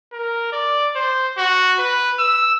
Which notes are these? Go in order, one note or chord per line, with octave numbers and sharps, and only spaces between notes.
A#4
D5
C5
F#4
B4
E6